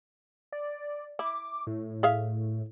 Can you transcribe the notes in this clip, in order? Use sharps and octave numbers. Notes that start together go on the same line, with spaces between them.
D5
E4 D6
A2
G#4 E5 F5